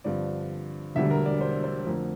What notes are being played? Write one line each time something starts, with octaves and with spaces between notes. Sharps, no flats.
G2 D3 F3 C4 D5
E1 D2 D3 G3 E5
A#4
D5
C5
C5
F2 D3 A3 C4 A#4